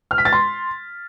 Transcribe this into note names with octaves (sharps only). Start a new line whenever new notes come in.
F6
B6
A6
C6